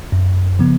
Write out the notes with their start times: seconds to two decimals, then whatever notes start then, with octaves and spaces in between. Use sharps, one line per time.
0.12 F#2
0.59 C#3 F3 B3